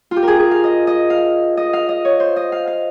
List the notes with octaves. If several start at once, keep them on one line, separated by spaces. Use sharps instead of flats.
F4
G4
G#4 A#4
G#4
F5
D#5
D#5
F5
D#5
F5
D#5
C#5
C5
D#5
F5
F5